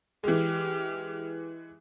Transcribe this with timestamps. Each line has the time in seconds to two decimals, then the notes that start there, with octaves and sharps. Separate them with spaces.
0.24 E3 G#3 G4 F6